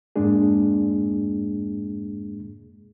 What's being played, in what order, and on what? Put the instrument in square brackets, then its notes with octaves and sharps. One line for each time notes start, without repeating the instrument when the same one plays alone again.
[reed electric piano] F2 G#2 G#3 A#3 D4 G#4